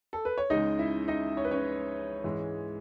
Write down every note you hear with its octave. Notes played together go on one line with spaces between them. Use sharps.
A4
B4
C#5
C#2 C#3 G#3 D#4 D#5
E4 E5
D#4 D#5
C#5
B4
C#4 C#5
G#2 E3 G#3